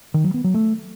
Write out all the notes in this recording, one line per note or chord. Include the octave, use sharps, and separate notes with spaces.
D#3
F#3
B3
F#3
A3